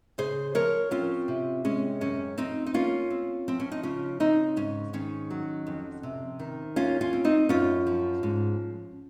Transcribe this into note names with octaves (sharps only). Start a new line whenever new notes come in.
C#3 G#4 C5
F3 A#4 C#5
C4 C#4 F4
C3
G#3 C#4
F#2 C#4
F2 C4 D#4
D#4
A#3 C#4 F4
C4
F3 C4
C#4
D#4
C#3 C#4 F4
C#3 C4 D#4
G#2 C#4
D#3 C#4
F#3
F2
C3
D#3
D#2 C#4 F4
C#4 F4
C4
C4 D#4
F#2 C#4 F4
F3
G#2